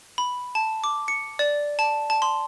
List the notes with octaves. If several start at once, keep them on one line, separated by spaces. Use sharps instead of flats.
B5
A5
D6
C#7
D5
A5
A5
C6